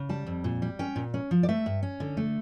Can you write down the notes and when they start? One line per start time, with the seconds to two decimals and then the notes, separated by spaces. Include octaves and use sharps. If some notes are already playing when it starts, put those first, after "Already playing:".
Already playing: C#3
0.09 G3 A5
0.26 F2
0.44 A#2
0.62 G3
0.79 C#4 G5
0.96 A#2
1.14 C#4
1.31 F3
1.43 D5
1.49 A3 E5
1.66 G2
1.83 C#4
2.00 D3
2.17 A3